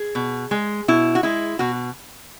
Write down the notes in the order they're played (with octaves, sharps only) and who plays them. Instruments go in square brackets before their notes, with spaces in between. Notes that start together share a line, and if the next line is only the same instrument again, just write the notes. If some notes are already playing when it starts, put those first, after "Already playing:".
Already playing: [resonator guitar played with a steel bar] G#4
B2
G#3
B2 E4
F#4
G#3 E4
B2 F#4